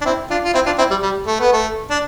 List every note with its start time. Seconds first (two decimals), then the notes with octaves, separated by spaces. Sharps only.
0.01 D4
0.05 C4 E4
0.30 D4 F4
0.44 F4
0.54 C4 E4
0.66 D4 F4
0.78 C4 E4
0.91 G3
1.02 G3
1.27 A3
1.40 B3
1.53 A3
1.90 D4